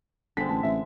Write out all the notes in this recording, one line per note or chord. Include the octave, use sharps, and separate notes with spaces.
G1 D3 G#3 C4 B6
A1 A5
A1 E5